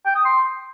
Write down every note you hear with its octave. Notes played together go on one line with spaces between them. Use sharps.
G5
D#6
C6